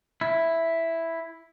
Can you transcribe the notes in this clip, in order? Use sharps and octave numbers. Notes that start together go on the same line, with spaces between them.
E4